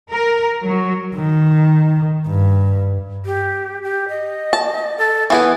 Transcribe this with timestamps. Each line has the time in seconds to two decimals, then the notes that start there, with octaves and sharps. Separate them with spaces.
0.11 A#4
0.64 F#3
1.16 D#3
2.27 G2
3.26 G4
3.83 G4
4.09 D#5
4.53 A5
4.98 A4
5.30 E3 B3 E4 G#4